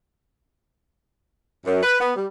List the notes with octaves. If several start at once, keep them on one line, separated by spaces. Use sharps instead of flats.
F#2
B4
B3
G3